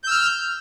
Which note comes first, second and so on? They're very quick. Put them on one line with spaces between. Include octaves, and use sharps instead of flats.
G6 E6 F6